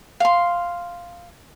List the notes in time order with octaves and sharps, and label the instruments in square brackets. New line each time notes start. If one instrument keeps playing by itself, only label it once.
[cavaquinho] F5 C6